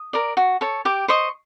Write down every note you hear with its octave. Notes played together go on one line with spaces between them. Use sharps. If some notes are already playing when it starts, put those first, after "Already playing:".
Already playing: D#6
A#4 D5
F#4
A4 C#5
G4 D6
C5 D#5 C#6